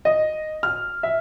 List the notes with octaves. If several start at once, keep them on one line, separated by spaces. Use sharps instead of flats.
D#5
F6
E5